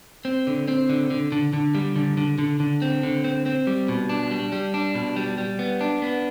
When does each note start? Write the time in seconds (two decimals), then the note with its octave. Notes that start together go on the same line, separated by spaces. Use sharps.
0.25 C4
0.47 D3
0.68 C4
0.90 D3
1.10 D3
1.32 D3
1.53 D3
1.75 G3
1.96 D3
2.17 D3
2.38 D3
2.60 D3
2.82 C4
3.03 D3
3.24 C4
3.46 C4
3.67 G3
3.88 B2
4.09 D4
4.31 G3
4.52 G3
4.74 D4
4.95 B2
5.16 G3
5.38 G3
5.59 B3
5.81 D4
6.02 B3